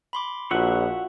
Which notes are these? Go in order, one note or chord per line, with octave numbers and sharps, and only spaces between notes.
B5 C6 D6
A#1 F4 F#4 C#5 E5 F#5